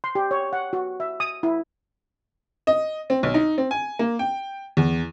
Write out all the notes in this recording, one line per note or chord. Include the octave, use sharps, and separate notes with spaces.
C6
G4
C#5
F#5
F#4
E5
D#6
E4
D#5
C4
B1
D#4
C4
G#5
A#3
G5
E2